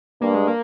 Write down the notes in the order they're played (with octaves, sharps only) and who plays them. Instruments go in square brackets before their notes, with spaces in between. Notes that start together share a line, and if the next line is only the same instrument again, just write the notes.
[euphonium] G2 [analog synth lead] A#3
[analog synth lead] G#3
A#3